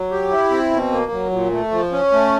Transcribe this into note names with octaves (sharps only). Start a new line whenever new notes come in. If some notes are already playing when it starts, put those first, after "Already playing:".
Already playing: F#3
G4
E4
C4
B2
A#3
F#3
A#2
A3
F3
C#4
A3